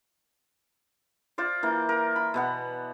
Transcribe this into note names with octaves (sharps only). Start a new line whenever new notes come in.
F4 C5 D5
E3 A#3
A#4
B5
B2 B3 F#5